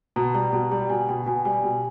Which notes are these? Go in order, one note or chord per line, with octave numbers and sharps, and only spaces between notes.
B2 A#5
G3 A#5
B2 A#5
G3 A#5
B2 G#5
B2 G5
B2 G#5
G3 G#5
B2